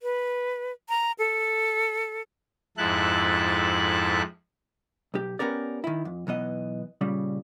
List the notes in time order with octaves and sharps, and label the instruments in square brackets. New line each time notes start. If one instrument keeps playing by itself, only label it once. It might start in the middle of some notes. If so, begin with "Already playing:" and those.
[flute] B4
A#5
A4
[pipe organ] F2 G#2 E4 A4 F#6
[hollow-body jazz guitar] B1 G4
B3 C#4 G4 A#4 D5
D#3 E4
F2
B1 E3 B3 D#5
A#2 C#3 G3